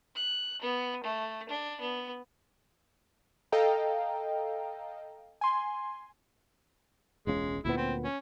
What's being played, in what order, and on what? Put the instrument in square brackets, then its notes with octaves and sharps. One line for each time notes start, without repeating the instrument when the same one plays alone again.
[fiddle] F#6
B3
A3
D4
B3
[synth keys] A4 D#5 F5 G5 A#5
G#5 C6
[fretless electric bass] E1 C#2 C#3 [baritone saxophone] G#3
[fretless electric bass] D2 A#2 B3 [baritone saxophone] E4
[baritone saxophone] C4
C#4